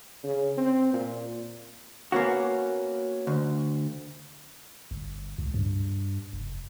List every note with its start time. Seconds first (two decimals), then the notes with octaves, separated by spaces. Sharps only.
0.23 C#3
0.57 C4
0.94 A#2
2.12 A#3 B3 C#4 F#4
3.27 D2
4.91 G1
5.38 C#2
5.54 G2
6.33 F1